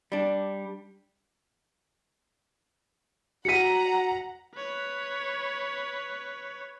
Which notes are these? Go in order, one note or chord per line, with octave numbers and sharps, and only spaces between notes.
G3 D4
F#4 F#5 A#5 B6 C#7 D#7
B4 C#5